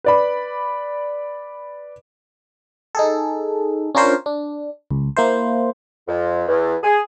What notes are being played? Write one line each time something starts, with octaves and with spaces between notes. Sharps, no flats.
B4 D5 B5
D#4 G#4 A4
C#4 D4 F4 A#4 C5 C#5
D4
C#2
A#3 E4 C5
F2
E2
G#4